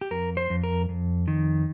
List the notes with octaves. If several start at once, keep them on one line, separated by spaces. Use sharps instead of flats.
G4
F2 A#4
C5
F2
A#4
F2
D#3